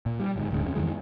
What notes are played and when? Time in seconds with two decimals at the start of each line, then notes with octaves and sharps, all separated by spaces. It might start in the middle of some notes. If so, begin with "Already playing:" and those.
0.06 A#2
0.20 G3
0.36 G1 G#2
0.51 D1 D2 G#2 C#3
0.63 F2 C#3
0.75 F2 D#3 E3 G#3